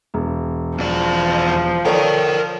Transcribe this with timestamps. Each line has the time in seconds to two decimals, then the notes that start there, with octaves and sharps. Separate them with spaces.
0.14 E1
0.78 E2 F3 D5
1.85 A4 A#4 C#5 D5 G5